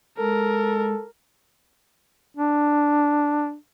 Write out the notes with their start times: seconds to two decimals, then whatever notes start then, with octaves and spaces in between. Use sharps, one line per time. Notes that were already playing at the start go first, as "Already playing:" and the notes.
0.19 G#3 A4 A#4
2.37 D4